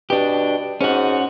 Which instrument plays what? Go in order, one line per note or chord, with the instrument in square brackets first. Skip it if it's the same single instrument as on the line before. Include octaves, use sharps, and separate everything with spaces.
[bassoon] B2 [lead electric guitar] D4 G4
[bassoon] G#2 [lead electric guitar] C#4 F#4